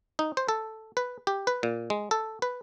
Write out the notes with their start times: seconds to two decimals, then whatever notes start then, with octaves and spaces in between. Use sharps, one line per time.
0.19 D#4
0.37 C5
0.49 A4
0.97 B4
1.27 G4
1.47 B4
1.63 A#2
1.90 G#3
2.11 A4
2.42 B4